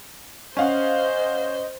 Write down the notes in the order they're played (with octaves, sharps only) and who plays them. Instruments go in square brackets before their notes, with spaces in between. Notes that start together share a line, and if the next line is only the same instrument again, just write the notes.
[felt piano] C#4 F5 F#5 [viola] C5 [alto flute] D#5